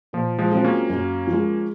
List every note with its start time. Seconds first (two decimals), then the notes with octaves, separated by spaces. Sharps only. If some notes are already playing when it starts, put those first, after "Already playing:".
0.13 A#2 F3
0.38 F3 G#3
0.51 F#3 C4 F4 G#4
0.64 A#3 C#4
0.90 F#2
1.27 F3
1.32 G#3